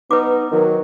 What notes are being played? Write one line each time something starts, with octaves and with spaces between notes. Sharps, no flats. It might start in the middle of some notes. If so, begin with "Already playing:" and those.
B3 D#4 B4 D6
D#3 F#3